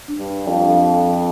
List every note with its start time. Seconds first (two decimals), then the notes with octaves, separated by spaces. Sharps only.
0.08 D4
0.19 G2
0.28 D4
0.47 F2 F5
0.67 A4